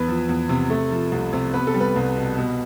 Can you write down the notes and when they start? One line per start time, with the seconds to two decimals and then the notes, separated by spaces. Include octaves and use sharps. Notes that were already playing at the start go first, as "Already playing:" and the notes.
Already playing: E2 B4
0.08 F3
0.29 E2
0.49 C3
0.70 A3
0.91 F3
1.12 C2
1.33 C3
1.54 B3 B4
1.67 A4
1.74 G3
1.80 B4
1.96 C2
2.16 B2
2.38 B2